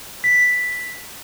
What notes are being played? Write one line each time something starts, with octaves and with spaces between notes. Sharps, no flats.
B6